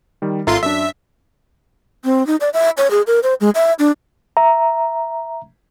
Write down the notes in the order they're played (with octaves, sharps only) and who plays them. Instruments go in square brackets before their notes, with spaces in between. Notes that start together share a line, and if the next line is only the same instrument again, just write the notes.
[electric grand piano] D#3 G3
[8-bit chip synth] G#1 F4 C6 [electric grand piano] A4 E5 A#5
[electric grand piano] F#2 D4 [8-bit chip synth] E5
[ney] C4
D#4
D5
E5
C#5
G#4
A#4
C5
G#3
E5
D4
[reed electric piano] E5 A#5